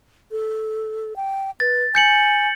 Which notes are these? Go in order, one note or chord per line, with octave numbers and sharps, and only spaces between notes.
A4
G5
B4 A6
G#5 G6 C#7 F#7